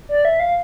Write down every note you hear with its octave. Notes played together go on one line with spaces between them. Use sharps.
D5
E5
F5